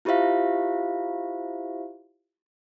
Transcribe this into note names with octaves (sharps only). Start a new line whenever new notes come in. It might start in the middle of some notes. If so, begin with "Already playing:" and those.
E4 F4 G4 C5 E5 F5